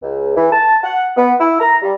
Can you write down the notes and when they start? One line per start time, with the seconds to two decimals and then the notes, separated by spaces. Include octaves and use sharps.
0.01 C#2
0.35 E3
0.51 A5
0.83 F#5
1.16 B3
1.39 E4
1.60 A#5
1.82 G3